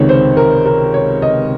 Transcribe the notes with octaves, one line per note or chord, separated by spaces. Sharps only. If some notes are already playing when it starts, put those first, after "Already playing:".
Already playing: C#2 C3 D#3 C#5
C5
A#4
A#4
C#5
D#5